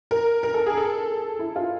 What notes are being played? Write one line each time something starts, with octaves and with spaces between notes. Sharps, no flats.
A#4
A#4
A4
G#4
A4
E4
F4